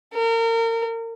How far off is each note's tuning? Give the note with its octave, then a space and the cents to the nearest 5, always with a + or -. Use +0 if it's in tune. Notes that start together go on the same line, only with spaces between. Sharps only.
A#4 -30